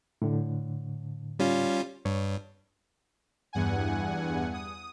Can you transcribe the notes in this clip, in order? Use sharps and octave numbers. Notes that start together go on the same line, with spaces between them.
A2 D3
G3 C#4 F4
G2 C#5
E2 G2 F#5 G#5
D#6